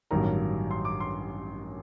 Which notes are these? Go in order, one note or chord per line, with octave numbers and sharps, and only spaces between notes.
A1 G2 D#3 F#3 A#5
C6
D6
C6